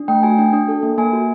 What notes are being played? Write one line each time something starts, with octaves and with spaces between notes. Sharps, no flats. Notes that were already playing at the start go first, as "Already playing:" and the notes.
Already playing: D4
A3 G5
F#4 G#5
D4 G5
D4
A4
A#3
A#3 G#5
F#4